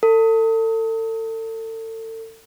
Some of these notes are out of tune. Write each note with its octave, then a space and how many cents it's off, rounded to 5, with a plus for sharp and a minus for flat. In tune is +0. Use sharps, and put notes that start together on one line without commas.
A4 +35